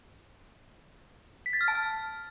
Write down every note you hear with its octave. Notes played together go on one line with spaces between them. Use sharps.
B6
A6
F6
A5
F6